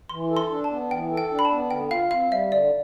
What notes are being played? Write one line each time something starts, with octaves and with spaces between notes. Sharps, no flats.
E3 C6
A4
C6
D4
A5
B3
E3 G5
A4
G5
D4
B5
A5
B3
D3 G5
F4 F5
C4 F5
G3 E5
D3 D5